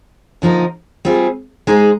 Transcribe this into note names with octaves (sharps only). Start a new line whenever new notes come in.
D3 F3 A#3 D#4 A#4
G3 C4 F4 G#4
G#3 D#4 G#4 C5